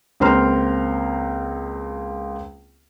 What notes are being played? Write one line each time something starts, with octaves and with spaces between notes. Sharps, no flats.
C#2 A#3 C4 A#5 C6 F6